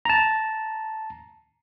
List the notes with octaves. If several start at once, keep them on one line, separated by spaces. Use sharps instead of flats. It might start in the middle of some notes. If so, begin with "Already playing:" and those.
A5 A#5